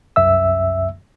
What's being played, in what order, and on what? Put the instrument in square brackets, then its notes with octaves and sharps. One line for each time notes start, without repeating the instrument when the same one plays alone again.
[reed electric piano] C2 F#2 E5 E6